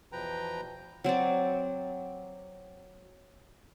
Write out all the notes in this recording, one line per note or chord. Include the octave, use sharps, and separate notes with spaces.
E2 B2 F3 B4 G5 A#5
F#3 C4 C5 D5